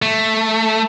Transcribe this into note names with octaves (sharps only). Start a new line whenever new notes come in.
A3